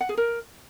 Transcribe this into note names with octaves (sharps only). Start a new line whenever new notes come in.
F#5
G#4
A#4